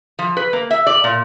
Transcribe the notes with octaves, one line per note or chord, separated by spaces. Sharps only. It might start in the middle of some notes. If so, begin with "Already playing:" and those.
F3
B4
A#3
E5
D5
A#2